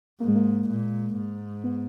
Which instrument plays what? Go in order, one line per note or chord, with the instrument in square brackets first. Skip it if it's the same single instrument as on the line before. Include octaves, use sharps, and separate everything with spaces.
[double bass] G#2 [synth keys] A#3
[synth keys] G#3
A#3
[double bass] A#2
G#2
[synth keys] B3